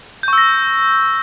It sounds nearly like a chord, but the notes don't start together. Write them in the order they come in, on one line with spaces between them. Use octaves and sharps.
G6 C#6 E6 A#6